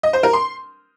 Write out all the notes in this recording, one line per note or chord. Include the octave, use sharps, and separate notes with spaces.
D#5
C5
A#4
C6